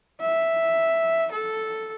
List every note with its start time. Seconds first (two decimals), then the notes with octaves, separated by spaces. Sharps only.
0.21 E5
1.32 A4